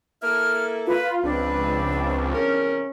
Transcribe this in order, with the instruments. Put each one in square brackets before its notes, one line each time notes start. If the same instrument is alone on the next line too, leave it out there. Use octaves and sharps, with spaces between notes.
[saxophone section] A#3 E4 A4 [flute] F6
[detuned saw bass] F4 [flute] B4
[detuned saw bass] C#2 [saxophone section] F3 C4 [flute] D4 [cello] B4
[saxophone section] E2 C3 A#4 [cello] C#4